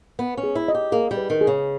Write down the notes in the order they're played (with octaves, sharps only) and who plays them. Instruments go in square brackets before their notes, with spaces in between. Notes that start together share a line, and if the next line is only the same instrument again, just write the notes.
[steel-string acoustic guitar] B3 [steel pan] B4
[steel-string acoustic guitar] C#4
[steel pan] G#4
[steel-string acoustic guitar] E4
[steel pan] D#5
[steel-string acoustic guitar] G4
[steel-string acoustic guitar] A#3 [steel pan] G#4
[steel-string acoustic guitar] G3
[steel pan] B4
[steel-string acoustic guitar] D#3
[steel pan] G#4
[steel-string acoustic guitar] C#3